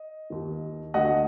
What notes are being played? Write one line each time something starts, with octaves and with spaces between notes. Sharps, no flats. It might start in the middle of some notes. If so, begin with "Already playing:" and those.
Already playing: D#5
D#2 D#3
D2 D3 D#5 F#5